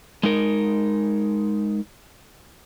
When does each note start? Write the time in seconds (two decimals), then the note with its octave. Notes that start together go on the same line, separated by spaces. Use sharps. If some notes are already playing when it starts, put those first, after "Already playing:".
0.23 G#3 D#4 A#4